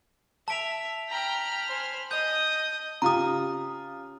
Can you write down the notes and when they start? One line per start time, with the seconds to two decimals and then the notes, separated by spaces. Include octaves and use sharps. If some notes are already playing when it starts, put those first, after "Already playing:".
0.48 E5 A5 D7 F7
1.09 G5 A#5 B5 F6
1.68 C5 G#5
2.11 D#5 D#6 G6
3.02 C#3 F4 G4 A#5 D#6